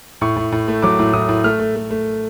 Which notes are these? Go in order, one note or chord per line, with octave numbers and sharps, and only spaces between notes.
A2 C#6
A2
A2
A3
F#3 D6
A2
A2 D#6
A2
A3 F6
A3
A3
A3